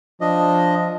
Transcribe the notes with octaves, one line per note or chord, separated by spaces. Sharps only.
F3 D4 D#5